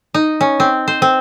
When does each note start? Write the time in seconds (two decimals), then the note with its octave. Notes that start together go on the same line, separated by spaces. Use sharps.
0.14 D#4
0.41 C#4
0.60 C4
0.88 C5
1.02 C4